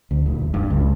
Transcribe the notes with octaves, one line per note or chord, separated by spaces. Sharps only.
D2
D#1
G2
C#2